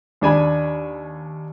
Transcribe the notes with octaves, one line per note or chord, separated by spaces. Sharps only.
D#2 D4 G#5 B5